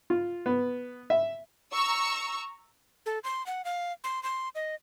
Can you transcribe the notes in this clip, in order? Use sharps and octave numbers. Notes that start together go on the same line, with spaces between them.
F4
B3
E5
A#5 C#6 E6
A4
C6
F#5
F5
C6
C6
D#5